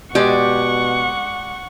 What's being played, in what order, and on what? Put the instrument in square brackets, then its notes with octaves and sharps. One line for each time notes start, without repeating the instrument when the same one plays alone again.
[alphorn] B2 [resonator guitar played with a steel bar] G#3 D5 [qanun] G4 [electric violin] F#5 C#6